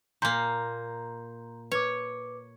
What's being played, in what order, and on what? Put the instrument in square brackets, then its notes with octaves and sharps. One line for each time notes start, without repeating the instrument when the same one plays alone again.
[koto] A#2 A#3 [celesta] A#5 C6 G6
[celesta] B4 D6 [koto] C#5